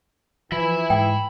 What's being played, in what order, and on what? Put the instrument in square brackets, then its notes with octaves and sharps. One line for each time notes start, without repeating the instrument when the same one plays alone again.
[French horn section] E3 [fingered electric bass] F3 [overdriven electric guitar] E5 B5
[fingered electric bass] G#2 [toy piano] G5